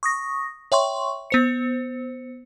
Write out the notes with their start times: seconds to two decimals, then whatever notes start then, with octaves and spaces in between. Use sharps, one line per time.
0.03 C#6 D#6 A#6
0.72 C#5 E5 G5 C6 C#6
1.30 B3 C5 C#7